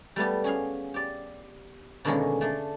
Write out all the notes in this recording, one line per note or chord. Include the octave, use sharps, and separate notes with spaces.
G3 A3 B3 G4
C#4 G#4 F5
G4 D5
B2 D3 D#3 G#3 A#3 C#4
A3 D4